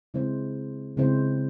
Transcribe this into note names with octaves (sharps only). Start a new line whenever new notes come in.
C#3 G#3 C4 E4 C5
C#3 G#3 C4 E4 C5